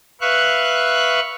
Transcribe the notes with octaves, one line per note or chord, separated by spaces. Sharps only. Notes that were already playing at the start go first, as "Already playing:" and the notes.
B4 E5 F5 C#6 F#6